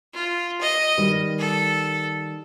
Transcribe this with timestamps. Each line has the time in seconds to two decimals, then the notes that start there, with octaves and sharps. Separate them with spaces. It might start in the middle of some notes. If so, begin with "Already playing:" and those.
0.14 F4
0.61 D#5
0.97 D#3 G3 B4
1.39 A4